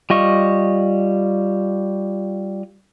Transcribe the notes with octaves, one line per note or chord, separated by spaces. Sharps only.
G3 F4 D#5 C#6